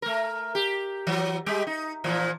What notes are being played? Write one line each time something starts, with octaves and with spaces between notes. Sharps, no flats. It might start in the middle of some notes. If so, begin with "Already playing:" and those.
A3 A#4
G4
E3 F#3
G3 G#3 G4
D#4
A#2 E3 F3